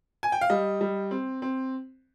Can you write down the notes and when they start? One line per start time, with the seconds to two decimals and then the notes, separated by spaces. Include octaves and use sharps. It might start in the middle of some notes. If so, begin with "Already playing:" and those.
0.23 G#5
0.32 G5
0.41 F5
0.50 G3 D#5
0.81 G3
1.11 C4
1.42 C4